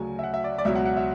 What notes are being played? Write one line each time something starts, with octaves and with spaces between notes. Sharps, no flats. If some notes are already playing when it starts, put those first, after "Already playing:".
Already playing: D2 C#3 F#3 G#5
E5
F#5
E5
D5
D5
C#2 B2 F#3 E5
F#5
F#5
E5